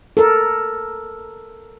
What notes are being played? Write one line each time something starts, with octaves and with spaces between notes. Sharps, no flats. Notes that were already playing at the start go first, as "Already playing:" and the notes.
A4 A#4